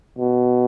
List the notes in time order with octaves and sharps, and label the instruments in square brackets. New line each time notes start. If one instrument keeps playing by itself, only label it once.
[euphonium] B2